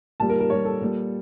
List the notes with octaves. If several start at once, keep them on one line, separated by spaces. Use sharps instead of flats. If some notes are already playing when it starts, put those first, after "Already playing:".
A#2 G3 A5
A#4
A#4
A#2 G3 C#5
A4
A#2 G3